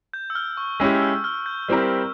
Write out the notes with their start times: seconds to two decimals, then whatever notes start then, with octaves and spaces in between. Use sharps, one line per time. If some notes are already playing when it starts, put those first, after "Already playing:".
0.13 G6
0.30 E6
0.35 F6
0.57 C#6
0.80 G#3 C#4 E4 G4 E6
1.02 E6
1.24 F6
1.46 G6
1.68 G3 C4 E4 G4 A#4